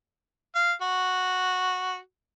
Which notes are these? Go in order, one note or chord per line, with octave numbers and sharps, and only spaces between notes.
F5
F#4